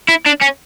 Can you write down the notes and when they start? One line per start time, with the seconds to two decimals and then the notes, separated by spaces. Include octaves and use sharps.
0.08 E4
0.26 D4
0.41 C#4